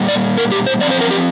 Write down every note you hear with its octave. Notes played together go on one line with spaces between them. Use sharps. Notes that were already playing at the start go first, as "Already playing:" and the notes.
Already playing: A#2 G3 A#3
D5
A#4
G4
C5
F3 C4 D5
C5
A#4
G4